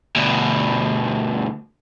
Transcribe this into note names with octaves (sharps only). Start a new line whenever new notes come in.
D2 B2